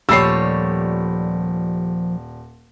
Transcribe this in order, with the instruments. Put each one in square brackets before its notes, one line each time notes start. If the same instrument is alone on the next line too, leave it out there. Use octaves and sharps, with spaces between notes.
[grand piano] D#1 B5 [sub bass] F3 [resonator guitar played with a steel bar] G3 A3 C#5 [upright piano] E6 C7